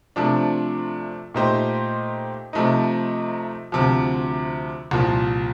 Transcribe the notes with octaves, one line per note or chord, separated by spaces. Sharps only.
C3 F3 A3 D4
A#2 A3 D#4 G4 C5
C3 F3 A3 D#4
D2 C3 F3
C2 A#2 F3